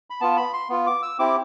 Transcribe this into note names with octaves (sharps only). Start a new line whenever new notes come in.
B5
B3 F4 A5
B5
C6
B3 F4
D6
E6
C4 E4 G4 D6